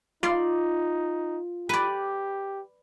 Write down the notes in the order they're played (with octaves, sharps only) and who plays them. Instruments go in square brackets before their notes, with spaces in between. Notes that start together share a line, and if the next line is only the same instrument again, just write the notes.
[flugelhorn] D#4 [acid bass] F4 [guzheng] D5 C6
[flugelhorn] G4 [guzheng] B4 D5